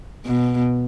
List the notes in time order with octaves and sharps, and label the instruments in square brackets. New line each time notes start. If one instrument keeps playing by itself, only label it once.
[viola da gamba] B2